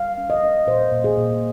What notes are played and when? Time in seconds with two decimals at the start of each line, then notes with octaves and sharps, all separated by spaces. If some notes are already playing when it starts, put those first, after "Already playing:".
Already playing: G3 F5
0.17 C#4
0.30 D#5
0.42 C#4
0.67 A#2 C5
0.92 A#2
1.04 G#4
1.18 A#2